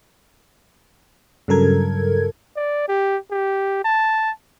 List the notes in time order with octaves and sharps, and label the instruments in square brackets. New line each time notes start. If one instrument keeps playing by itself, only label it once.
[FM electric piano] G2 C#3 F#3 A4 A#4 G#6
[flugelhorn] D5
G4
G4
A5